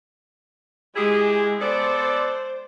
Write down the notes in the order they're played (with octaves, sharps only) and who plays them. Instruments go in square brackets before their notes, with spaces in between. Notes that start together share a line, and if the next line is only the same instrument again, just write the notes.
[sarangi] G#3 [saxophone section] E4 G4 G#4
[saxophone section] B3 A4 D5 [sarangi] C5